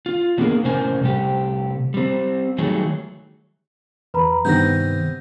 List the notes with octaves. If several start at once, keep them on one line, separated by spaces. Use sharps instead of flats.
F4
F#3 A#3 B3 D4 G#4 A#4
A2 C3 C#4 A#4 C5 G#5
C3 G3 A3 G4
G3 C4
D#3 F#3 G3 A3 G#4
E2 B4 A#5 B5
G2 C3 D#3 B3 F#4 G6 A#6